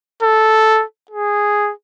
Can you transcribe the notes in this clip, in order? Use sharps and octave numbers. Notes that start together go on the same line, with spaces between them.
A4
G#4